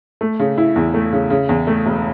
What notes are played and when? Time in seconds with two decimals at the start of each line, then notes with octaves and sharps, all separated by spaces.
0.21 A3
0.39 C#3
0.58 E4
0.76 E2
0.94 A3
1.13 C#3
1.30 C#3
1.49 E2
1.67 A3
1.86 E1